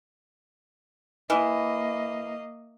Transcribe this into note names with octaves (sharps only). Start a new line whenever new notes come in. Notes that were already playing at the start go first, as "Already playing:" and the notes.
E3 A#3 D#5